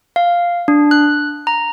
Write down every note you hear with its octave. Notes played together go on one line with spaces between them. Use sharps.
F5
D4
F#6
A#5